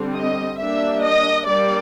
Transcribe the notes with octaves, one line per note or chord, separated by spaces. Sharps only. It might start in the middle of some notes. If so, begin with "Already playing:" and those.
Already playing: D3 G3 C4
D#5
G3 A#3 D4 E5
D#5
G3 A#3 D4 D5